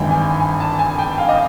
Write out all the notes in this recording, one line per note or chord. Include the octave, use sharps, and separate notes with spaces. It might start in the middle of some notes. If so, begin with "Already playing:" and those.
Already playing: G#1 G2 E3 G5
G#5
G#5
A5
G#5
G5
F5
D#5